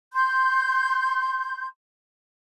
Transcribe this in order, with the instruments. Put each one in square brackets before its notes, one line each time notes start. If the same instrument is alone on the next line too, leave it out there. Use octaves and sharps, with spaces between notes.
[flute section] C6 G6